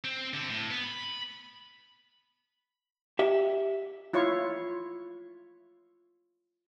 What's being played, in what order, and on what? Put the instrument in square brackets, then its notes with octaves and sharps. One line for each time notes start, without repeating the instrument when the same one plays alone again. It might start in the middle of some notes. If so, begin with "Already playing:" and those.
[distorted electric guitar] C4
D3 C4
A2
B3
B5
[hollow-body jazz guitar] G4 E5
[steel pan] E4 F4 C#5 C#6